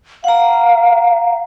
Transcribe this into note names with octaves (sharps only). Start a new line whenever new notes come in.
F5 F#5 A#5